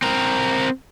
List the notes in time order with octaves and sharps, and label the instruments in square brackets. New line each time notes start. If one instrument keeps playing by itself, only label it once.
[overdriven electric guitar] C4 A#4